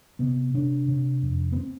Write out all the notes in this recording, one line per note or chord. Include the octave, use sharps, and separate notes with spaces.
C3 B3
C3 D4
C3
F2
B3
C4